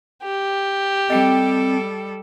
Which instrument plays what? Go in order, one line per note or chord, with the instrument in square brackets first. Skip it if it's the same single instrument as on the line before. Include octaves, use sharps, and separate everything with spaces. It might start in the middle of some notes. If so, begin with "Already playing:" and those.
[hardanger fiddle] G4
[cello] G3 A4 [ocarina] C4 [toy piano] D#5 G5